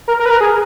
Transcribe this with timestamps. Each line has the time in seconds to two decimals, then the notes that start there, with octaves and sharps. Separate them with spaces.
0.08 A#4
0.19 A#4
0.26 B4
0.31 A#4
0.40 G#4